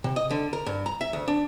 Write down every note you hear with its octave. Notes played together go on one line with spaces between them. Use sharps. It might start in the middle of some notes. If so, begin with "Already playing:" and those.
C3
D#5
D3
A#4
G2
A#5
E5
D2
D4